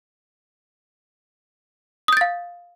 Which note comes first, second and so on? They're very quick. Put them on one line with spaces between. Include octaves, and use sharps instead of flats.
D#6 G6 A6 F5